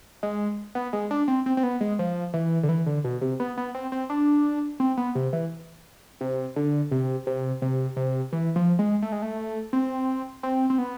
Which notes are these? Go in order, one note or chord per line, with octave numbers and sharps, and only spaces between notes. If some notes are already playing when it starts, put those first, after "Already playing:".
G#3
B3
G#3
D4
C4
C4
C4
B3
G#3
F3
E3
D3
E3
D3
B2
C3
B3
B3
C4
C4
D4
C4
B3
C3
E3
C3
D3
C3
C3
C3
C3
E3
F3
G#3
A3
G#3
A3
C4
C4
C4
B3